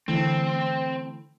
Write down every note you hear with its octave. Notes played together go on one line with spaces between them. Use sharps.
D3 E3 A3 C4